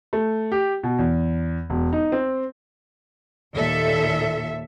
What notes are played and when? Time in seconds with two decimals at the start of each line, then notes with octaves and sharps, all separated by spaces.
0.13 A3
0.52 G4
0.83 B2
0.99 E2
1.70 E1
1.93 D#4
2.12 C4
3.54 D#2 A#2 A4 E5